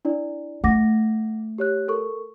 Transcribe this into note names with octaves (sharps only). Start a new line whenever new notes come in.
D4 E4 D5
A3 F#5 D6 A#6
G4 C#5 F#6
A4 A#4 C#6